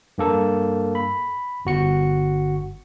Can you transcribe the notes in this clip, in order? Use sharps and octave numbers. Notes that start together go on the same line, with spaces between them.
G2 A#3 A4
B5
G1 F#4 C#7